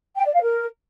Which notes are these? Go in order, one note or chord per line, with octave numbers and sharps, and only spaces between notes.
G5
D5
F5
A#4